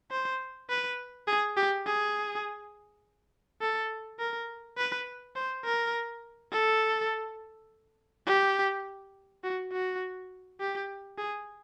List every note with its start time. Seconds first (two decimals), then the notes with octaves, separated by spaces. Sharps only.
0.11 C5
0.69 B4
1.28 G#4
1.57 G4
1.86 G#4
3.61 A4
4.19 A#4
4.77 B4
5.36 C5
5.65 A#4
6.53 A4
8.27 G4
9.44 F#4
9.72 F#4
10.60 G4
11.18 G#4